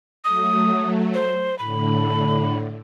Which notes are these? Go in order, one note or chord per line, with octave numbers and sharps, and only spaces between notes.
F#3 A3 D#6
C5
A2 D3 B5